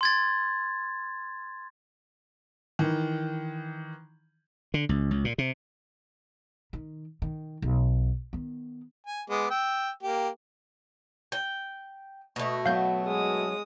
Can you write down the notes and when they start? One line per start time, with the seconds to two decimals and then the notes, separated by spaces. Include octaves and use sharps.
0.01 C6 G#6 A6
2.79 D#3 E3
4.74 D3
4.89 C#2
5.11 C#2
5.25 A#2
5.38 C3
6.73 D#3
7.22 D#3
7.62 B1
8.33 D#3 B3
9.06 G#5
9.30 G#3 B3 D6
9.50 G5 E6
10.03 A#3 G4
11.32 G5
12.36 B2 A3
12.66 F#3 B3 F5 G6
13.06 G#3 D#6